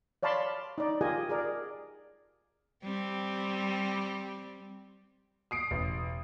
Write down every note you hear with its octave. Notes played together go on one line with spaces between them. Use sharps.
C#5 D5 F5 A5 B5 C6
D#4 D5
F4 G4 G#4 A#4 D#5 G#5
G#4 A#4 D5
G3 C4
D#6 C7 D7
E1 A1